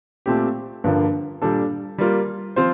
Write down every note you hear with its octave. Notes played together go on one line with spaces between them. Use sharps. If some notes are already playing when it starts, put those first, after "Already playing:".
A#2 A3 C4 G4
G2 D3 F3 A#3
A#2 G3 D4 A4
G3 A#3 F4
F3 C4 F4 C5